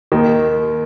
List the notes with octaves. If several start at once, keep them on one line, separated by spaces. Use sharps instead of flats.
D#2 D#3